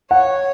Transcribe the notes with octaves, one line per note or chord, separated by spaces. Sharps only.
C#5 F#5